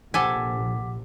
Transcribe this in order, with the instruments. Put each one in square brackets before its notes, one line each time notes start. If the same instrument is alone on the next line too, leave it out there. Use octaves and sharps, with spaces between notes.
[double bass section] A#1 [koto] C3 A4 G#5 [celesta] F#5 D6 B6